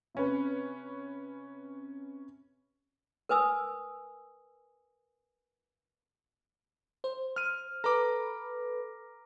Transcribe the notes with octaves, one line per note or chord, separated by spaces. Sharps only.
C3 C#4 B4
A#4 B4 G#5 D#6 E6
C5
F6 D#7
A4 B4 A#5 B5 D6